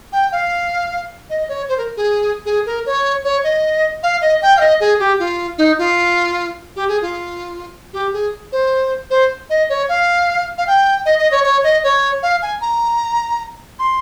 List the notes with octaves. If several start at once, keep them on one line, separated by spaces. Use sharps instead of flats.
G5
F5
D#5
C#5
C5
A#4
G#4
G#4
A#4
C#5
C#5
D#5
F5
D#5
G5
F5
D#5
G#4
G4
F4
D#4
F4
G4
G#4
F4
G4
G#4
C5
C5
D#5
C#5
F5
F5
G5
D#5
D#5
C#5
C#5
D#5
C#5
F5
G#5
A#5
C6